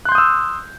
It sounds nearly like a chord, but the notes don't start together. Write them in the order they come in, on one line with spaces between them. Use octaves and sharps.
F#6 C6 G6 D#6 E6